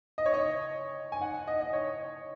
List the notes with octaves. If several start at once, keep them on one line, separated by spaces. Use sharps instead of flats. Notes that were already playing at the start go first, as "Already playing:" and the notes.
D#5
C#5
D#5
G#5
F#5
D#5
D#5
C#5